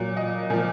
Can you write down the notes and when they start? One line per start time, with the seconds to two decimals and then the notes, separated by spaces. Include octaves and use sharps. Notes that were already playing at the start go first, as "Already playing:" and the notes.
Already playing: A#2 F#3
0.17 D#5
0.50 A#2 F3